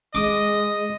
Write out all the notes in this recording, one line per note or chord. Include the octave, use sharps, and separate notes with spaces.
G#3 D#5 D6 D#6